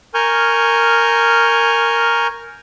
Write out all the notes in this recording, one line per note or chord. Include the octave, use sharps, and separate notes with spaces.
A#4 G#5 C#6 F6 G6